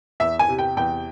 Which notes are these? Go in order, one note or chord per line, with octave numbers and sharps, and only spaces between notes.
E2 E5
G#5
C3
G5
E2 G5